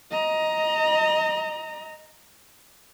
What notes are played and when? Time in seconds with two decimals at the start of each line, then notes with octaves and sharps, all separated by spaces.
0.11 D#5 A#5